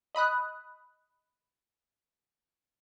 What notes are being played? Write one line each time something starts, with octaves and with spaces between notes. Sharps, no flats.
D#5 B5 D#6 F#6